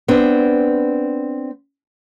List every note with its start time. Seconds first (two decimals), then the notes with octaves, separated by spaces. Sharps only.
0.08 B3 C4 D4